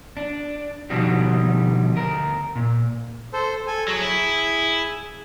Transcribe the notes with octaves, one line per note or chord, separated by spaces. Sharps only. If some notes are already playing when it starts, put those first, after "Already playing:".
D4
B2 D3 F3 G3 D#4 F#4
D2 A#4
A#2
A4 C5
A4 G#5
F#3 G#4
E4